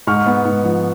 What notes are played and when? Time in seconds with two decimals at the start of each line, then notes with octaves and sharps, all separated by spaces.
0.07 G#2 C#6 F6
0.26 B3
0.45 G#2
0.64 F3